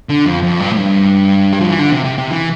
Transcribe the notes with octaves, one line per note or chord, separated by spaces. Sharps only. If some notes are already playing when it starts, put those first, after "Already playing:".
D3
F2
F2
G2
A2
G2
G3
F3
E3
D3
C3
C3
C3
E3